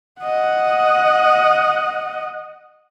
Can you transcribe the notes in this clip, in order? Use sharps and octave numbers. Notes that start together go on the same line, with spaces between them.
D#5 F#5